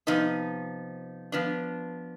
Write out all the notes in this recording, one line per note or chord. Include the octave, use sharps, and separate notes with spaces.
C3 F3 B3 D#4
F3 B3 D4